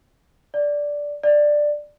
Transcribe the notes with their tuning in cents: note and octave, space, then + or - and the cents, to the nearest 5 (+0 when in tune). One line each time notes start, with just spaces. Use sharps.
D5 -5
D5 +10